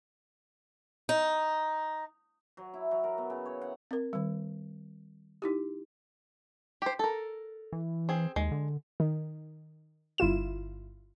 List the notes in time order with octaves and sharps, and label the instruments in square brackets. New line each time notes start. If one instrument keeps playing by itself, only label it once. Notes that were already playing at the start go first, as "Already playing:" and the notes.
[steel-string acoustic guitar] D#4
[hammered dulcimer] F#3
E4
F#3
A#4
B3
C#3
C#5
F#5
[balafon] C4 A#4
D#3 G3
D#4 E4 G4
[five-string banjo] G4 C5
A4 A#4
[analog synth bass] E3
[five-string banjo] C4 G#4
[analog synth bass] D#2 [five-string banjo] G#3
[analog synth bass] D3
[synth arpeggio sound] D#3
G1 E4 F4 E7